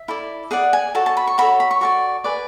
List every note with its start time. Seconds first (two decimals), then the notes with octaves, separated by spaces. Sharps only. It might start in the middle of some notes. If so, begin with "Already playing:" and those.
Already playing: E5
0.08 E4 A4 D5
0.51 G#4 D5 F#5
0.73 G#5
0.95 F#4 A4 C#5 A5
1.06 A5
1.17 B5
1.27 C#6
1.38 F#4 A4 C#5 B5
1.60 B5
1.71 C#6
1.81 F#4 A4 D5 C#6
2.24 G#4 B4 D5